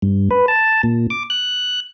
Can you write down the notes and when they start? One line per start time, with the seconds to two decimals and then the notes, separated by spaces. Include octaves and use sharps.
0.02 G2
0.31 B4
0.48 A5
0.83 A#2
1.10 D6
1.30 F#6